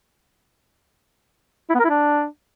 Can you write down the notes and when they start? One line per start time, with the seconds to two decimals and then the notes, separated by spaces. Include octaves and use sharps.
1.70 E4
1.75 B3
1.80 A#4
1.85 E4
1.90 D4